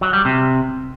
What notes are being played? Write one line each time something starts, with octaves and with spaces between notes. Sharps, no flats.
F#3
G3
C3